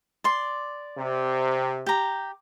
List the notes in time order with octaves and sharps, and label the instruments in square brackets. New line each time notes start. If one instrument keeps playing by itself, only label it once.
[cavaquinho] D5 C6
[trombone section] C3
[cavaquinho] G4 A#5